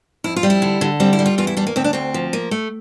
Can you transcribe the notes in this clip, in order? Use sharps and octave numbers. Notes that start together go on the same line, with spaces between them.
F2 E4
F4
G3
E4
D3
D3
G3 C4
E4
G3
F4
E2 F4
E4
G3 D4
A#3
D2 C4
D4
D2 C4
F3
A#3
A3